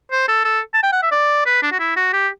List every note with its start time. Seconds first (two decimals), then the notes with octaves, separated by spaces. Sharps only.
0.11 C5
0.28 A4
0.45 A4
0.74 A5
0.83 G5
0.93 F#5
1.03 E5
1.12 D5
1.46 B4
1.63 D4
1.72 F#4
1.80 E4
1.96 F#4
2.13 G4